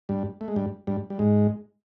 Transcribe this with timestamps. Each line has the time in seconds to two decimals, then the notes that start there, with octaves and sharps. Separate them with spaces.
0.09 G2 G3
0.41 A3
0.48 G#3
0.56 G2 G3
0.87 G2 G3
1.10 G3
1.19 G#2 G#3